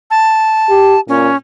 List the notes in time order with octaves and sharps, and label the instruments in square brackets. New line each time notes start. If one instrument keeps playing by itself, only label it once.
[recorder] A5
[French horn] G4
[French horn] A#2 [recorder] C#4